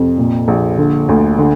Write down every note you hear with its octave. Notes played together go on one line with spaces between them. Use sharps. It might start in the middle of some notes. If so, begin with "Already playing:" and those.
Already playing: F2 C3
A#2
A#1
D3
D2
D3